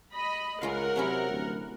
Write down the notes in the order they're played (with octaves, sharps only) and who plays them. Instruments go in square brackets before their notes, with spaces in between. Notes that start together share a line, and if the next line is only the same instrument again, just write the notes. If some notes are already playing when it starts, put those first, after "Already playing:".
[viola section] D#5 B5
[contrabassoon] C#2 [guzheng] C#4 F4 F5 [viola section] A#4 F#5
[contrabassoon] C3 [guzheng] F#3 C#4 E4
[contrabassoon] D1